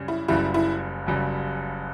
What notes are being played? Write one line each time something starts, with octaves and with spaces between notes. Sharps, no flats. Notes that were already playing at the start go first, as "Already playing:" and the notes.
Already playing: F#2 C#3 G3 C#4
E4
F#1 F#2 C#3 G3 E4
E4
F#1 F#2 C#3 G3